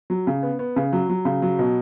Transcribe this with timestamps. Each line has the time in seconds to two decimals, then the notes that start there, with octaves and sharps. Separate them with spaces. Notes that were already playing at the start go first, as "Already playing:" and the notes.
0.10 F#3
0.27 C#3
0.43 B3
0.59 B3
0.76 C#3
0.93 F#3
1.09 F#3
1.25 C#3
1.42 F#3
1.59 B2